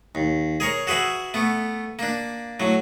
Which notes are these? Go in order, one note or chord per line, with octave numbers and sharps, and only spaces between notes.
D#2
G#4 A#4 C#5
F#4 G#4 B4 E5
A3 B3
A#3 D4
A2 F#3